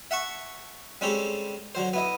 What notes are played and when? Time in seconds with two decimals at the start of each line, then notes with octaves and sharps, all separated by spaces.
0.11 E5 F#5 A5 C#6
1.01 G3 G#3 C4 C#4 G4 A4
1.75 D3 F#3 C5
1.93 B3 E4 D#5